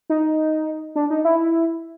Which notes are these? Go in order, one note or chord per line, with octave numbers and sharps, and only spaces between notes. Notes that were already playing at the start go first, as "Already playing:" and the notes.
D#4
D4
D#4
E4